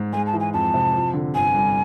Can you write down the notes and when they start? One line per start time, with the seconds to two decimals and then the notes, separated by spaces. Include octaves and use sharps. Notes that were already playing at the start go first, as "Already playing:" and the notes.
Already playing: G#2
0.13 G#3 G#5
0.26 A5
0.33 E3
0.40 G#5
0.53 F2 A5
0.74 C3
0.94 F3
1.14 D3
1.34 G1 G#5
1.55 G2